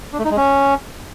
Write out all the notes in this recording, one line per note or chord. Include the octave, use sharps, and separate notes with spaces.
D4
A3
D#4
G#3
C#4